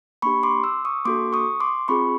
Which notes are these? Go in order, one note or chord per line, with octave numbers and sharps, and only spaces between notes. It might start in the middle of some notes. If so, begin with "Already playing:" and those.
A#3 D4 G4 B5 C#6
C6 D6
D6 E6
C#6 D#6
A#3 D4 F#4 A4 C6 D6
C#6 D#6
C6 D6
C4 F4 G#4 B5 C#6